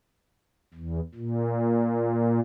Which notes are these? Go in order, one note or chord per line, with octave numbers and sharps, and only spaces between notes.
E2
A#2